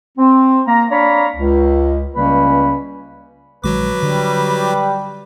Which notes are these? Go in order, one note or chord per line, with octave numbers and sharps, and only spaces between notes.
C4
A#3 A#5
D4 C#5 D5 F5 A#5 B5
C#2
C#2 C#3 G3 A#3 C#4 B4
A#1 D#3 F#3 G#3 F#4 B4 D6
D3 G3